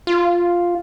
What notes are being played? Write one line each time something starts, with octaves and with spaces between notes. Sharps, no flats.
F4